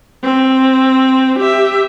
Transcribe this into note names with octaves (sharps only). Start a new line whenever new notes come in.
C4
G4 E5